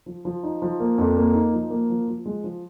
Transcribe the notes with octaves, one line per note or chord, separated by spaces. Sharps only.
F3
F3
D#4
F3
A#3
F2
A#3
D#4
F3
A#3
F3
F3
G#3
F3